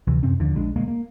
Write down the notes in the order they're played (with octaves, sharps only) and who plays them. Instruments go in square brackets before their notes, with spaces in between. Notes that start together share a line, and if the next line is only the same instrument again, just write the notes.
[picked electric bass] D2 C3 E3
F#2 C3 C4 C#4
D#2 D3 F3
A#1 G#3 D4
E1 D2 G#3 A#3
A#3